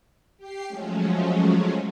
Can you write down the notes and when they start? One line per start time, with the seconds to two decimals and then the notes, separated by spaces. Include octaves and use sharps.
0.37 G4 G5 C7
0.68 F3 F#3 G#3 A3 C#4